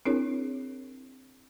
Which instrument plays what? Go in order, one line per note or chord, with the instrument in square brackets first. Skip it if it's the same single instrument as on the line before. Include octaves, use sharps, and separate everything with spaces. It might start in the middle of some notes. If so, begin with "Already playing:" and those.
[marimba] C4 D4 E4 G#4 A#4 C#5